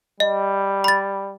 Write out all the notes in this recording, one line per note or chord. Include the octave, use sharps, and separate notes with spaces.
G3 D#5
B5 A6